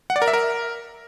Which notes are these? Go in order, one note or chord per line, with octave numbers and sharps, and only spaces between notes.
F#5
D5
A#4
E5
A#4